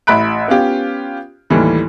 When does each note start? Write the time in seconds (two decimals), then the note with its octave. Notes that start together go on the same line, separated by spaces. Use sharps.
0.07 A1 E5 B5 F#6 D7
0.48 B3 C#4 F4 G4
1.50 D#2 A2 D#3 E3 G3